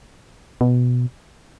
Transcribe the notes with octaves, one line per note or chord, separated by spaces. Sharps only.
B2